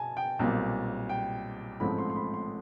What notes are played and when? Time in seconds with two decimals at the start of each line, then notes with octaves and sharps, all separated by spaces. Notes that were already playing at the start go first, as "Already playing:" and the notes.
Already playing: B2 G#5 A5
0.17 G5
0.39 B1 A#2 G3 C4
1.09 G5
1.80 A1 G#2 F3 A3 C4 B5
1.98 C6
2.10 C6
2.16 B5
2.34 C6